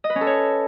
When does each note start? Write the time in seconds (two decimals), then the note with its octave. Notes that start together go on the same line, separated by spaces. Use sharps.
0.04 D#5
0.10 B4
0.15 C#4
0.21 A4
0.27 C#5